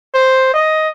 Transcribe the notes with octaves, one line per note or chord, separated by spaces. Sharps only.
C5
D#5